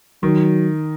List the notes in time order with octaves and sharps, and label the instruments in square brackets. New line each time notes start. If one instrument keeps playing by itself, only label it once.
[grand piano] D#3 [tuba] F#3